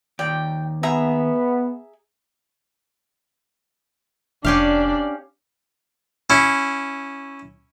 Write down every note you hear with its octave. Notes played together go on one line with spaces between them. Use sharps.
D#2 D5 G5
B3 G#4 E5 A#5
F1 C#4 D4 G4 D5 F5
C#4 E4